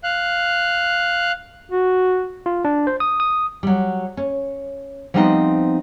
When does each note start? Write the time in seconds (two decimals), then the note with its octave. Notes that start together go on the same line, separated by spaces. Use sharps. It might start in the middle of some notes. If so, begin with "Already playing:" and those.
0.04 F5 F#6
1.72 F#4
2.46 F4
2.65 D4
2.87 C5
3.00 D#6
3.20 D#6
3.63 F#3 G3
4.17 C#4
5.14 F3 G3 B3 C4 D4 D#4